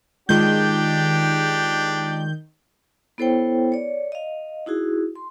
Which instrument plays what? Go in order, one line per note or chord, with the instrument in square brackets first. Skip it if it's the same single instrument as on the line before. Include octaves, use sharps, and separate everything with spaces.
[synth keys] D#3 G6 [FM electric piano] G#3 F4 G#4 [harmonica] D4 G4 D5
[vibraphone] B3 E4 A4 C5 C#5 G5
C#5 D5
D#5 F5
D#4 E4 F#4 G#4
C6